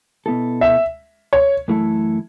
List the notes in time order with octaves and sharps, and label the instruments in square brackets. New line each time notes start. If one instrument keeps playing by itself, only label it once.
[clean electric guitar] B2 B3 E4 A4
[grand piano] E5
C#5
[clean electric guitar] F#2 E3 A3 E4 A4